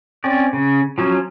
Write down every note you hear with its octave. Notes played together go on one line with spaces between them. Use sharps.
C4 C#4 D5
C#3
F3 F#3 C#4